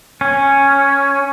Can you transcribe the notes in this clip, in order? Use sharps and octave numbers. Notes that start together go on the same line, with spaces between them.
C#4